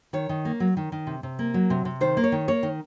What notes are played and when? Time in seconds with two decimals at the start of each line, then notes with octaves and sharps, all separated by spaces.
0.13 D#3 C#5
0.29 D#3
0.45 A#3
0.60 F#3
0.77 D#3
0.92 D#3
1.07 C3
1.23 C3
1.39 A#3
1.54 F#3
1.70 C3
1.85 C3
2.01 D#3 C5
2.17 A#3
2.24 C#5
2.32 D#3
2.48 A#3 C#5
2.63 D#3